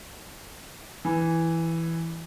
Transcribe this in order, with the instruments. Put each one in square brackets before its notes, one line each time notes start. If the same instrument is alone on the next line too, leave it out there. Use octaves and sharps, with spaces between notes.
[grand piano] E3